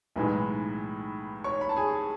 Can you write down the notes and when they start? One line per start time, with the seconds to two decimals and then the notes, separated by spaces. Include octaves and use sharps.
0.16 B1 A2 E3 G#3 D#4 B4 B5
1.44 C#5 C#6
1.61 B5
1.69 A5
1.76 G#4 G#5